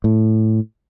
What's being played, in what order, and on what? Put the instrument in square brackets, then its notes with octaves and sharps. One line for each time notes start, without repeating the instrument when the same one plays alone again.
[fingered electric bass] A2